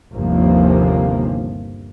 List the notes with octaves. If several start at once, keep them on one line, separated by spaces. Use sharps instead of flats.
G1 D#2 C3 F3 A#3